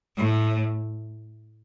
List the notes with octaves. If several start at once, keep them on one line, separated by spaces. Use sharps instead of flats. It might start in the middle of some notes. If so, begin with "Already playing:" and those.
A2